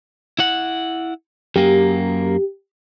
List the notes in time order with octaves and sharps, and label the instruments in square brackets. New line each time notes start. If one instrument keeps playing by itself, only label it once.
[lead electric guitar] E4 F#5
[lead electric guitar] F#2 A#3 [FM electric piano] G4